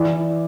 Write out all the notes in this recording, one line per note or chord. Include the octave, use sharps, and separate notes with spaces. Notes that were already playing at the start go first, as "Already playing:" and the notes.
Already playing: E3 D5